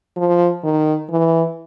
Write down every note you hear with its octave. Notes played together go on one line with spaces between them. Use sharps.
F3
D#3
E3